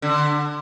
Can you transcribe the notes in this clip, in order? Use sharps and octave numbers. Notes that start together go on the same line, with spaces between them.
D3